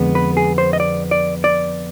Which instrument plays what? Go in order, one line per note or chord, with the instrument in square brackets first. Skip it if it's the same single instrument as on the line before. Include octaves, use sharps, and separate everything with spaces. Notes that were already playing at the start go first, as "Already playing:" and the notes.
Already playing: [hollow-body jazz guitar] F2 D3 G#3 B3
B4
G#4
C5
D#5
D5
D5
D5